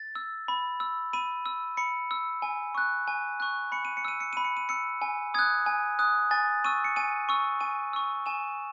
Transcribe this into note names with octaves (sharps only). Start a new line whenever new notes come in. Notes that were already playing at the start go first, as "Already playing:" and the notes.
Already playing: A6
E6
B5
E6
B5 D#7
E6
B5 C#7
E6
G#5
C#6 F#6
G#5
C#6 F#6
B5 C#7
D#7
C#7
E6 D#7
C#7
B5 D#7
C#7
D#7
E6 C#7
G#5
D#6 F#6 G#6
G#5
D#6 F#6
G#5 A6
C#6 E6 D#7
C#7
G#5 D#7
C#6 E6
G#5 D#7
C#6 E6
G#5 E7